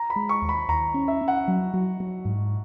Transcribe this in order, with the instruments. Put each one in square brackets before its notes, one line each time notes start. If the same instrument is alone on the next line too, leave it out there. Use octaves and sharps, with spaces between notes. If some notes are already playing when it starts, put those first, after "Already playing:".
Already playing: [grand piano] A#5
B5
[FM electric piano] G#3
[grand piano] C#6
[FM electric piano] D#2
[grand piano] B5
[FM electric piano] D#2 [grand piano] A#5
[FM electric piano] C#4
[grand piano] E5
[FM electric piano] C#4
[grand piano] F#5
[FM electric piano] F#3
F#3
F#3
G#2